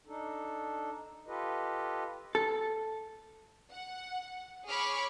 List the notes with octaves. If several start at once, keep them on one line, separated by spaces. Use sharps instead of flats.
D4 D#4 A4
F4 G4 A4 B4 D#5
A4
F#5
G#4 C#5 B5 C#6 D6 F6